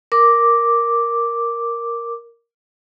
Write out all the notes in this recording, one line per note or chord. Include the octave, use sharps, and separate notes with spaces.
A#4 D6